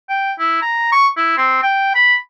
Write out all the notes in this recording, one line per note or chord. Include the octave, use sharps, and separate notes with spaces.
G5
E4
A#5
C#6
E4
C4
G5
B5